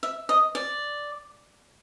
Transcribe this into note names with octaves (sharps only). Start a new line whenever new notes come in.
E5
D#5
D5